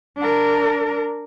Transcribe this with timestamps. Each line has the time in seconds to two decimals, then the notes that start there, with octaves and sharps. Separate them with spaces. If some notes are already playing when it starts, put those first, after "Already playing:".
0.17 D4 A#4